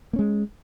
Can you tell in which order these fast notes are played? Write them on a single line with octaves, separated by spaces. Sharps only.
A#3 C#4 G#3